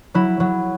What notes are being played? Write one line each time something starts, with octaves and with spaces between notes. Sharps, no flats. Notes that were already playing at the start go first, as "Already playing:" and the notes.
F#3 E4
F#3